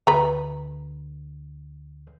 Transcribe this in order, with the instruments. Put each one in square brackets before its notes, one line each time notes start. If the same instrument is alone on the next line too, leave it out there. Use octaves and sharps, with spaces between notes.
[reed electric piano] D2 [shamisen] B4 A#5